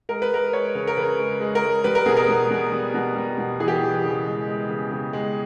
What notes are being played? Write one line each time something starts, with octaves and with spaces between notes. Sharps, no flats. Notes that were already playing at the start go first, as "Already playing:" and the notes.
G#3 A#4
B4
G#3 A#4
G#3 C#5
C#3
A#4
C#3 B4
G#3
G#3
A#4
G#3
G3 B4
A#4
B2 G#4
A#4
B2
B2
G3
B2
G3
B2
E3 G#4
G4
G#4
E3
C#3
G#3
G#3
C#3
C#3
G#3